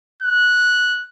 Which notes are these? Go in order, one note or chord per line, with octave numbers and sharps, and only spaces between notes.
F#6